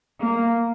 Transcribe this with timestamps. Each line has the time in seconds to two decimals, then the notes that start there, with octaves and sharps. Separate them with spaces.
0.19 A#3